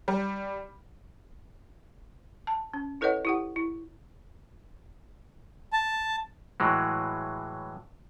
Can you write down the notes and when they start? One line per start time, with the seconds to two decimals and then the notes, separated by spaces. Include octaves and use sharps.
0.08 G3
2.47 A5
2.74 C#4
3.01 E4 A4 B4 C#5 D#5 F#5
3.25 E4 G4 F#5
3.56 E4
5.73 A5
6.60 A2 E3 F#3 G#3